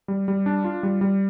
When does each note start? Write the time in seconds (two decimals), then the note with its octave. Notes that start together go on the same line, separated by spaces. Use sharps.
0.08 G3
0.28 G3
0.46 D4
0.64 F4
0.83 G3
1.01 G3